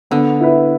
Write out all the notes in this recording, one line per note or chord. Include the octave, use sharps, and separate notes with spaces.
D3 B3
E4 B4 E5